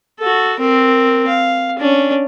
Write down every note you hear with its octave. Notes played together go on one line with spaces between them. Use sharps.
F#4 A4
C4 A#4
F5
C#4 D4